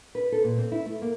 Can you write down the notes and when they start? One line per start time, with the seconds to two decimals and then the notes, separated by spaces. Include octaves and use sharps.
0.15 B4
0.32 A4
0.44 A#2
0.58 C4
0.72 E4
0.86 A3
1.02 A#3